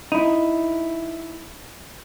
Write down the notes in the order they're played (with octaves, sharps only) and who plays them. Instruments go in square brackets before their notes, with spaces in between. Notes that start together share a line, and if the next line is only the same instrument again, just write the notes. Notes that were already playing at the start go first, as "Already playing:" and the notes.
[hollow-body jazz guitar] D#4 E4